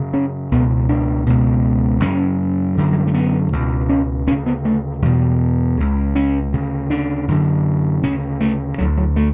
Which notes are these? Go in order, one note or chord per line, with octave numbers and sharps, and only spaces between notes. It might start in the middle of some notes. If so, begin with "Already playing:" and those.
Already playing: F#2 C#3
C#4
C#2 B2 B3
D4
C#2 B2
F#2 C#3 C#4
F#2 D3
F#3
G3
A3
B3
C#2 B2
C#4
D2 C#3 C#4
B3
A3
E2 B2 G3
C#2 C#3
C#4
D2 C#3
D4
F#2 D3
D2 C#3 C#4
A3
D2 D3 F#3
F#3
A3